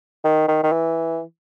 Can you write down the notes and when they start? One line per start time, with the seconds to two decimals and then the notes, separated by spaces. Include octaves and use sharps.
0.24 D#3
0.48 D#3
0.63 D#3
0.72 E3